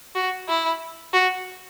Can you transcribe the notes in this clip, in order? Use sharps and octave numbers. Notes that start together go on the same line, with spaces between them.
F#4
E4
F#4